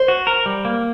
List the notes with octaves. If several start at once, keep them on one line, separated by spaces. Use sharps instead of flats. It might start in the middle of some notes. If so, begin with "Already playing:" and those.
Already playing: C5
F#4
A#4
G3
A#3